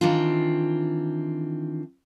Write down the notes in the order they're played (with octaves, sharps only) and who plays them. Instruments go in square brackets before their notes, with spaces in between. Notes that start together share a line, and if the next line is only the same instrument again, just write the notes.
[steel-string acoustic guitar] D#3 E3 C4 D4 F4